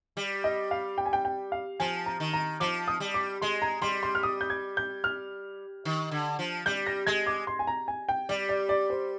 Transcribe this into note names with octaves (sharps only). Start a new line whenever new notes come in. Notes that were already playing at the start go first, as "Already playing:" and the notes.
G3
D#5
F5
G5
G#5
G5
G5
F5
F3 G#5
A#5
D#3
A#5
F3 D6
D#6
G3
D6
G#3 C6
A#5
G3 C6
C6
F6
D#6
G6
G#6
G6
F6
D#3
D3
F3
G3 G6
A#6
G#3 G#6
D6
C6
G#5
A#5
G#5
G5
G3 D5
D5
D5
C5